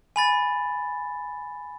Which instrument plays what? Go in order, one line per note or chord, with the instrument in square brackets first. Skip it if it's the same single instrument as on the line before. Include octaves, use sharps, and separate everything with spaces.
[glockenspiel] G#5 B5 A6